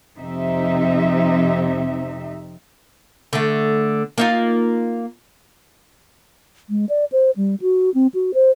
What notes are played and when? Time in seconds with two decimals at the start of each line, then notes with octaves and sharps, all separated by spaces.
0.18 F2 C3 C4 D#4 E5
3.33 D3 A3
4.18 A#3 D#4 F4
6.69 G#3
6.89 D5
7.12 C5
7.36 G3
7.61 F#4
7.94 C4
8.14 F#4
8.34 C5